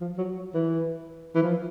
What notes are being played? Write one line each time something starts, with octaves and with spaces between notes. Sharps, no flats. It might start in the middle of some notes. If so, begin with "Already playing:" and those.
F3
F#3
E3
E3
F3